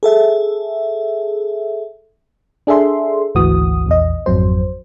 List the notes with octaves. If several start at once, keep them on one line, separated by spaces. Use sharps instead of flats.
G#4 A4 E5
D4 G#4 A4 E5 C6
G#1 D2 E3 F#4 D#6
A#1 E2 D#5
G#1 F2 F#3 C5